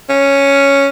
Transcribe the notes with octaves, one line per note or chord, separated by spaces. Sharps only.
C#4